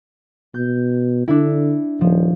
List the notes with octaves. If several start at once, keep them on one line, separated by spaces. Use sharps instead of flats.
B2 G6
D3 D4 E4
D#1 F3